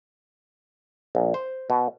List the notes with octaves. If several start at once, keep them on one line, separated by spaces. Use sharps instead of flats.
A#1
C5
B2